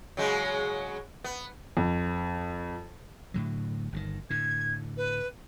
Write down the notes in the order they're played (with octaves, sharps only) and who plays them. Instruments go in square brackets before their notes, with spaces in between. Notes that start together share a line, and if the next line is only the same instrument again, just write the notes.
[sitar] C#3 F#3 G#3
B3
[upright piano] F2
[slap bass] A2 D3 F#3
G1 C3 D#3
[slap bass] A2 D3 [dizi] G#6
[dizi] B4